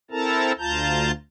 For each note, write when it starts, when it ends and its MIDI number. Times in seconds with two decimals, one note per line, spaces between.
0.11 0.52 60
0.11 0.52 64
0.11 0.52 69
0.11 0.52 70
0.11 0.52 81
0.11 0.52 82
0.59 1.11 38
0.59 1.11 65
0.59 1.11 81
0.59 1.11 82
0.59 1.11 91